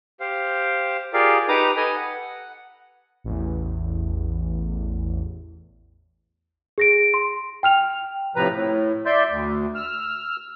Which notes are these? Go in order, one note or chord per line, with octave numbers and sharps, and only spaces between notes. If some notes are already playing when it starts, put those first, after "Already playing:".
G4 C5 F5
F4 G4 G#4 A#4 D5 F5
D#4 G4 B4 A#5 D6 D#6
A4 B4 D#5 G#5
F#5
A1 E2
G#4 A#6 D7
C6
G5 F6 F7
A2 C3 F3 B4 A#5
A2
D5 E5 C6 G6
D2
E6 F6